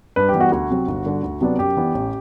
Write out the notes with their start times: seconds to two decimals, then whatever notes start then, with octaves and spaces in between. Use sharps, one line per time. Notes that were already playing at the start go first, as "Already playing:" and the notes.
0.16 G2 B4
0.29 G4
0.34 E3 G3 B3 D4
0.40 F#4
0.52 D2 F#4
0.70 C3 F#3 C4
0.87 G1
1.05 G2 D3
1.23 D2
1.41 C3 F#3 B3 D4
1.59 F#2 G4
1.77 E3 B3 D4
1.94 A1